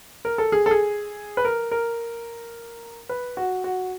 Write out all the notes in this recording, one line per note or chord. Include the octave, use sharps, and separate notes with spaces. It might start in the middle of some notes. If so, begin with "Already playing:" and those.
A#4
A4
G#4
A4
G#4
B4
A#4
A#4
B4
F#4
F#4